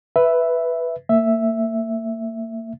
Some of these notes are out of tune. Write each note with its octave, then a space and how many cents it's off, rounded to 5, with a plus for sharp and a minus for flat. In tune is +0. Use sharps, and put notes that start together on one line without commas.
B4 +0 E5 +0
A#3 -30 E5 +0